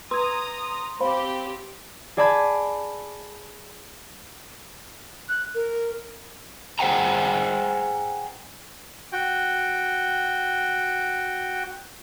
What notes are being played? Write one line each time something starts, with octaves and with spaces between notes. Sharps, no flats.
B4 A#5 C6 D#6 G#6
C4 G4 C5 F5 B5
G#4 D5 G#5 A5 B5 G#6
F#6
A#4
G#4 C5 F#5 G5 A#5
F#4 G5